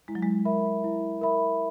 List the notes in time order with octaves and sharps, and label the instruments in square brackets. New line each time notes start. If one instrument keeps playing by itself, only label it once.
[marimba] G#3 [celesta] E4
[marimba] F#3
G#3
[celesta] A#4 E5 B5
E4
A#4 E5 B5